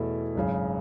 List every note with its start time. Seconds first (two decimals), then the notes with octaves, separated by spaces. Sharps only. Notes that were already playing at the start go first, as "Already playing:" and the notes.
Already playing: E2 B2 A3 E4
0.35 G#1 F#2 C#3